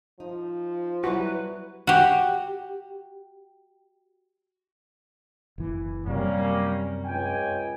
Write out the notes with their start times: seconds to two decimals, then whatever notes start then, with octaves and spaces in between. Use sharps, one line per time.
0.20 F3 D#4
1.04 F#3 G3 E4 F#4 B4
1.87 F#4 G4
5.58 F#1 E3
6.06 F#2 C3 F#3 G3 A#3 C#4
7.05 C#2 G5 G#5